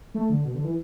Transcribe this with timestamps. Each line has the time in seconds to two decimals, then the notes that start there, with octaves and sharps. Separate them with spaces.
0.14 A3
0.30 D3
0.44 B2
0.54 D3
0.64 E3